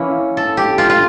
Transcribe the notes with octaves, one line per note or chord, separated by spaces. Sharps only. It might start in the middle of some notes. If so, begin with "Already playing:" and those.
Already playing: E3 A#3 C#4 E4
A4
G4
F4
F4